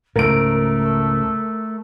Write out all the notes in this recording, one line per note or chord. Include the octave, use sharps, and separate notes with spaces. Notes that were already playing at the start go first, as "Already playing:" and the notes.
C#2 G#2 A3 A#4 D7